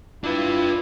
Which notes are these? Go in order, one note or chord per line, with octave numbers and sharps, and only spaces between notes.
D4 E4 F4 B4